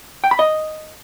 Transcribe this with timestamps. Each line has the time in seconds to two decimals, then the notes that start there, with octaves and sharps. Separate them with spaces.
0.24 G5
0.31 B5
0.39 D#5